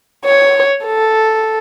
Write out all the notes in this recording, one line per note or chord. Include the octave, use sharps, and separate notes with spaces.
C#5
A4